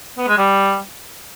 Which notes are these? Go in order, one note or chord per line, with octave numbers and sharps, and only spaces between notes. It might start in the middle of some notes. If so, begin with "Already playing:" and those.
B3
G#3
G3